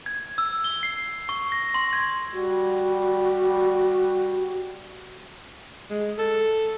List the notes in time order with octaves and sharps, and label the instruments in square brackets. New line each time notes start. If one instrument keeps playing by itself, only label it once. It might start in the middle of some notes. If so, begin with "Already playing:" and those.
[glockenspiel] G#6
E6
G7
C7
C#6
A#6
C6
G#6
[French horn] G3 [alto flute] F#4
[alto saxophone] G#3
A4